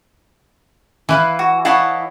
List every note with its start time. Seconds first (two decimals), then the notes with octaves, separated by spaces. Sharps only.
1.09 E3 B4 E5 F5
1.39 F#4
1.65 E4 C#5 D#5 F5 F#5 A5